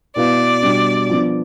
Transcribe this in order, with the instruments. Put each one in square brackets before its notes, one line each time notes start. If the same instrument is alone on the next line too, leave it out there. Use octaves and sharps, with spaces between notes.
[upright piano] B2 B3 E4 B4 F5 [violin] D5
[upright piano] B2 G3 D4
F3 B3 D4